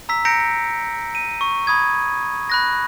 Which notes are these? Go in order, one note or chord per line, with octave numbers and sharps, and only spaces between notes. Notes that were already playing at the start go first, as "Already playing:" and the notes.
A#5 E6 B6
A#5 G6 A#6 C#7 D7
D#7
C#6
B5 D#6 G#6
B5 F#6 A#6